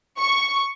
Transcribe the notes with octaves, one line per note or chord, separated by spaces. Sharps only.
C#6